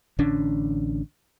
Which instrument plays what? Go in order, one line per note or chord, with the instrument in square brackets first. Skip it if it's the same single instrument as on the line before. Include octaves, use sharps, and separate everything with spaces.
[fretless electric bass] A1 D3 C#4 D4